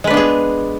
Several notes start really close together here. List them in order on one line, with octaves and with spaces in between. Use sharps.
G#3 B4 D4 B3 G#4